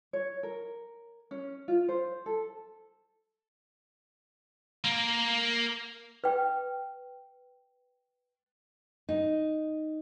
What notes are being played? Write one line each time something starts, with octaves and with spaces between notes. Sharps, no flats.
C#5
A#4
C#4
F4
C5
A4
A#3
B4 G5
D#4